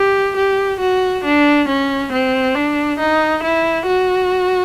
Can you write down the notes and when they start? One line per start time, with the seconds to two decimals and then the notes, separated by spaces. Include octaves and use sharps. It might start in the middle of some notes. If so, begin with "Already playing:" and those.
Already playing: G4
0.37 G4
0.80 F#4
1.24 D4
1.68 C#4
2.12 C4
2.55 D4
2.99 D#4
3.44 E4
3.87 F#4